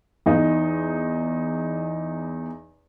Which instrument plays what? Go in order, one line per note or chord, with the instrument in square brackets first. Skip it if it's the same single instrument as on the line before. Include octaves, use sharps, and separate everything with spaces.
[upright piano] E2 D#4